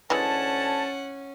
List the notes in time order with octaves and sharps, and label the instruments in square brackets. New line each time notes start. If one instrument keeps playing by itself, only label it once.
[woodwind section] D2 G#5 A5 [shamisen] E3 G#3 [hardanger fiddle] C#4 [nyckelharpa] F#5